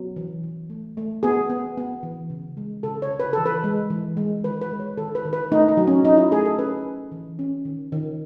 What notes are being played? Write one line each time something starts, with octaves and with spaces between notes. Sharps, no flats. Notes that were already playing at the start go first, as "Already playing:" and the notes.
Already playing: F#3 B3
E3
E3
A3
A3
B3 G#4
B3
B3
E3
C#3
G#3
C#3 A4
C#5
C#3
B4
E3 A4
B4
G#3
E3
G#3
D#3 B4
B4
G#3
C#5
D#3 A4
B4
D#3
B4
A3 D#4
D#4
F#3
C#4
F#3 D#4
E4
A3 G#4
A4
C#4 B4
C#4
E3
C#4
D#3
D#3